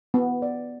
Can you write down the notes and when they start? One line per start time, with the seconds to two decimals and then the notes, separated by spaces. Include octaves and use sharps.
0.14 B3
0.42 D5